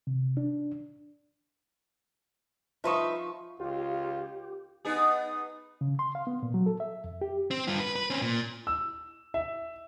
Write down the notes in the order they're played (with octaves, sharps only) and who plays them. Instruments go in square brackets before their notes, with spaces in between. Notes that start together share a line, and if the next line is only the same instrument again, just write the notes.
[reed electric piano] C3
D4
[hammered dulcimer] F3 C#6 [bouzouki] D#4 B4 E5
[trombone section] C#2 F4 [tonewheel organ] G4
[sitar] B3 D#4 G#4
[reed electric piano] C#3
C6
F5
B3
A#2
F#3
A4
E5
F2
G4
[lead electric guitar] C4
G2 F4
B4
B4
C4 C#4
A#2
[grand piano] E6
E5